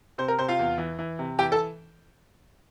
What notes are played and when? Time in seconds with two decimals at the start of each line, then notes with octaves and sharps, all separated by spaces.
0.18 C3 C5
0.28 A#4
0.39 C3 C5
0.48 F4 F5
0.59 E2
0.78 E3
0.99 E3
1.19 C3
1.39 E3 G4 G5
1.52 A4 A5